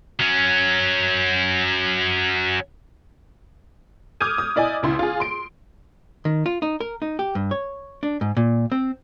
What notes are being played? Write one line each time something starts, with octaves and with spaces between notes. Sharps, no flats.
F#3 C#4
D6 D#6 F6 G6 G#6 D#7
D#6
E4 D5 D#5 G#5
C#2 E4 C6
F4 G#4
C6 D7
D#3
F4
D#4
A#4
D#4
G4
G2
C#5
D4
G#2
A#2
C4